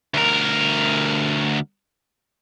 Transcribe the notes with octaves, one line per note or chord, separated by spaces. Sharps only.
D2 A#4